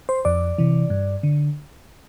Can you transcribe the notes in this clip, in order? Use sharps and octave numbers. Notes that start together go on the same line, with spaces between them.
C5
F2 D5
C3 E3
G2
D3